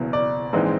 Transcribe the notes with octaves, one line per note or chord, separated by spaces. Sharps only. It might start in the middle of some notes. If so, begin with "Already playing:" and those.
Already playing: F#1 E2 B2
D5
A#1 G#2 E3 G#3 C4